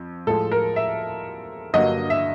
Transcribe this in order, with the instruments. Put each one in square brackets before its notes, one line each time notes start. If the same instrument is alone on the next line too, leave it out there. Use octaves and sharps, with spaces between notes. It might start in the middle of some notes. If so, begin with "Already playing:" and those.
Already playing: [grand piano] F2
A2 F3 G#3 A4
A#4
E5
G2 D3 F#3 A#3 D#5
E5